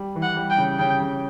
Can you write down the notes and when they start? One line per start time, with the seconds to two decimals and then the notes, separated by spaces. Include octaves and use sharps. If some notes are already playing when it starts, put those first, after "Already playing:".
Already playing: G3
0.15 E3
0.23 F#5
0.36 G3
0.51 G5
0.58 C#3
0.79 C#3 G5
1.00 C#3